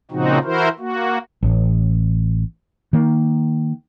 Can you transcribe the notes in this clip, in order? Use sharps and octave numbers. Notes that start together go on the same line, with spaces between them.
A#2 C#3 F3 C4 D#4 F#4
E3 E4 F#4 A#4 C5
A#3 F#4
A1
D#3 A#3